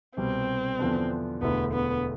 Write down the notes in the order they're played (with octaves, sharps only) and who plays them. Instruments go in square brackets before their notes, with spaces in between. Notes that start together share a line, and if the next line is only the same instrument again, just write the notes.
[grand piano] C2 B2 G3 [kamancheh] C4
[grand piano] E2 D3 F3 B3 D4
[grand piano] E1 D2 D3 A3 E4 [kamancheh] B3
[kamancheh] B3